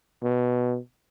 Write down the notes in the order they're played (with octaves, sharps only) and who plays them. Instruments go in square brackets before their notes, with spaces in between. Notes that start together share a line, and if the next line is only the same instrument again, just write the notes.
[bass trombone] B2